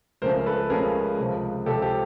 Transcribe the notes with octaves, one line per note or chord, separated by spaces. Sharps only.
C#2 C#3 F3 A3 C#4 A#4 C5
A4 B4
C#2 C#3 F3 A3 C#4 G#4 A#4
C#2 C3 F3
C#2 C3 F3 G4 A4
G4